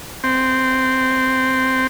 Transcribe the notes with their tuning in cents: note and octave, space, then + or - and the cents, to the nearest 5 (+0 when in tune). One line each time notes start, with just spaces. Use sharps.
C4 -10